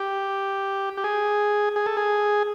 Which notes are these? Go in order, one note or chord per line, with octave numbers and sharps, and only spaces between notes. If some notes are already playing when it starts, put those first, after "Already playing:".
Already playing: G4
G4
G#4
G#4
A4
G#4